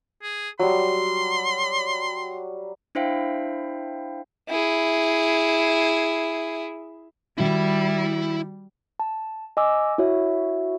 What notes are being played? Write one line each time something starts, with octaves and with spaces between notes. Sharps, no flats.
G#4
F#3 G3 C6
D4 E4 C5 E5 F5 G5
E4 G#4
D#3 G3 E4 F#4 E5
A5
D#5 G#5 D6 E6
E4 F#4 C#5 E5